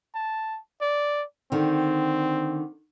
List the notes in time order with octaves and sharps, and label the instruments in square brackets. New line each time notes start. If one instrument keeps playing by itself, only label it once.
[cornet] A5
D5
[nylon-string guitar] D3 D#3 [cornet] C4